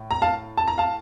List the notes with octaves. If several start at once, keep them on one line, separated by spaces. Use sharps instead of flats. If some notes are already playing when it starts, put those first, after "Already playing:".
Already playing: A2
A#5
F5 A5
A5
A#5
F5 A5